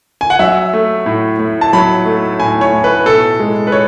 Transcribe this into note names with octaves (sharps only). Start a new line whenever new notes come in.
G#5
F#5
F#3 E5
A3
A2
A2
A5
F#3 B5
A3
A2 G#5
C#5
A2
B4
B2 A4
G#3
B4
C#5